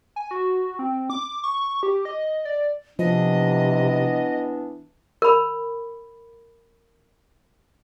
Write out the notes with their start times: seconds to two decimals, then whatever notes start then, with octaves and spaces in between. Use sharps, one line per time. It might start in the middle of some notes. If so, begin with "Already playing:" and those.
0.16 G#5
0.31 F#4
0.79 C4
1.10 D6
1.43 C#6
1.83 G4
2.05 D#5
2.45 D5
2.99 C3 E3 F3 B3 D4 D#5
5.22 A#4 B5